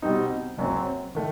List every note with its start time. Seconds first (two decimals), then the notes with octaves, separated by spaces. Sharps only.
0.02 B2 G3 C4 D#4
0.57 F#1 F#2 F#3 C4
1.15 D#3 A3